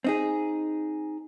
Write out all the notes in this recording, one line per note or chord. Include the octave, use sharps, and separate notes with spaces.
C4 D#4 G#4